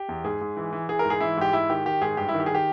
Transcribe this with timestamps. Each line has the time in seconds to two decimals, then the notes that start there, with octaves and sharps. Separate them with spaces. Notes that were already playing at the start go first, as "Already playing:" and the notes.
Already playing: G4
0.09 E2
0.24 G#2 G#4
0.41 G#2
0.57 E3
0.73 E3
0.89 E3 G#4
0.99 A#4
1.05 G#2
1.10 G#4
1.20 E3 E4
1.37 G#2 G4
1.53 G#2 E4
1.70 D#3 G4
1.86 D#3 G4
2.01 G#2 G#4
2.17 G2 G4
2.29 E4
2.34 D#3
2.40 G4
2.46 G#4
2.50 D#3 G4